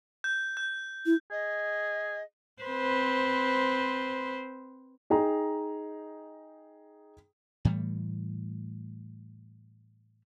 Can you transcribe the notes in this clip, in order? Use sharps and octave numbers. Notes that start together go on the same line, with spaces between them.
G6
G6
E4
G#4 D#5
C4 B4 C5
D#4 G#4 G5 A#5
A2 E3 G3 A3